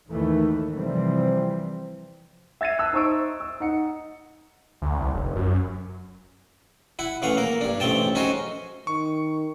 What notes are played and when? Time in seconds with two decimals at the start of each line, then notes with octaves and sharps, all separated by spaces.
0.11 D#2 D#3 E3 A3
0.74 C3 E3 F3 G3 C4
2.61 E5 G#6 A6 C7 D#7
2.79 A5 E6 F#6
2.93 D#4 C5 E5 C#6 E6 D7
3.40 E6
3.60 D#4 F#5 C#7
4.82 D2
4.99 C2
5.14 F1
5.36 F#2
6.99 E4 F#5
7.22 C#3 E3 A3 F5 F#5
7.37 A#3 A#4
7.61 G2 D4
7.80 A1 C#3 A3 C4 G5 A5
8.15 C#4 D#4 F#4 G#4 C5
8.87 D#3 C#6